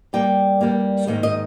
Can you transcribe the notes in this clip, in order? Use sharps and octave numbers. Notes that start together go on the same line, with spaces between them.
G2 G3 A#3 G5
G2 G3 A#3
G#2 D#3 A#3 D#4
D#5